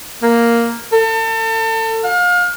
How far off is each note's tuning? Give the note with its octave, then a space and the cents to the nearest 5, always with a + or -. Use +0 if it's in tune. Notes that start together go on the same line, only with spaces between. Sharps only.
A#3 +0
A4 +35
F5 +35